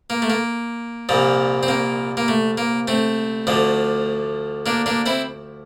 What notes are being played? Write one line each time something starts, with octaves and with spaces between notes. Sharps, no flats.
A#3
A3
A#3
C2 A#2 F3
C4
A#3
A#3
A3
A#3
A3 C4
D2 D3 F3
A#3 D4
A#3 D4
C4 E4